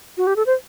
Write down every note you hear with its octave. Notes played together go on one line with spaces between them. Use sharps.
F#4
G4
A4
C5